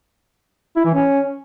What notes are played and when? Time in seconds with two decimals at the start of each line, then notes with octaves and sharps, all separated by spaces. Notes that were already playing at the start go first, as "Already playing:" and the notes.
0.76 E4
0.85 E3
0.94 C#4